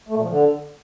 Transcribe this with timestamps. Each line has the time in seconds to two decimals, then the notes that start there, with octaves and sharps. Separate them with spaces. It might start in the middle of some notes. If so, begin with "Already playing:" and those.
0.09 A3
0.16 A#2
0.23 F3
0.30 D3